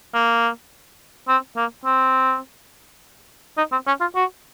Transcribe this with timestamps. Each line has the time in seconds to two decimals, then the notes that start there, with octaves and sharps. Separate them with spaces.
0.14 A#3
1.28 C4
1.56 A#3
1.85 C4
3.57 D#4
3.72 C4
3.87 C#4
4.01 F4
4.15 F#4